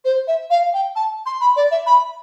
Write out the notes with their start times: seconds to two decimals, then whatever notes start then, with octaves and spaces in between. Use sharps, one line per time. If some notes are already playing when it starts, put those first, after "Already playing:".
0.05 C5
0.27 E5
0.50 F5
0.73 G5
0.96 A5
1.26 C6
1.41 B5
1.56 D5
1.71 E5
1.86 B5